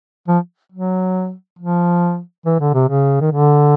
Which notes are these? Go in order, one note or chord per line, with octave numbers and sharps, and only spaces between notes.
F3
F#3
F3
E3
D3
C3
C#3
D#3
D3